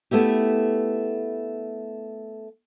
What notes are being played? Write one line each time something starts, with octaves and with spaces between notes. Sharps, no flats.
A3 B3 E4 G4